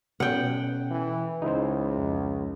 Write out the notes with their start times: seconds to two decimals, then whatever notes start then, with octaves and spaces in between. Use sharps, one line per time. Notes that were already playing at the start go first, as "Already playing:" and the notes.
0.20 B2 C#4 A4 F#5 G5
0.90 E3
1.42 C#2 D#4 E4 C5
1.98 F2